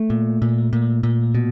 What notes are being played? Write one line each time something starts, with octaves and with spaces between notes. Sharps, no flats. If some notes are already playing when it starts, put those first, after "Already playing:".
Already playing: A3
A#2
A#2
A#2
A#2
B2